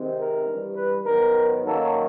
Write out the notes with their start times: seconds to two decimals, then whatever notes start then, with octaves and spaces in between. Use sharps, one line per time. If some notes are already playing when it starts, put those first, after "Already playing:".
Already playing: C3 D#3 G#3 C4
0.17 A#4
0.45 G2 E3 G3
0.76 B4
1.06 G#2 D#3 F#3 B3 A#4
1.66 F#2 D#3 F#3 A#3 A4